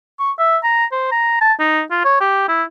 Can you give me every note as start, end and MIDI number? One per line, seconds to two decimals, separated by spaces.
0.19 0.32 85
0.39 0.58 76
0.63 0.85 82
0.92 1.08 72
1.12 1.40 82
1.41 1.53 81
1.59 1.82 63
1.91 2.01 65
2.05 2.16 73
2.21 2.45 67
2.48 2.63 64